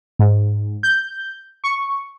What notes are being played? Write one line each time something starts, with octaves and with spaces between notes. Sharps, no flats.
G#2
G6
C#6